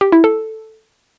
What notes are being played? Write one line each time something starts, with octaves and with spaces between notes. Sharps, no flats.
G4
E4
A4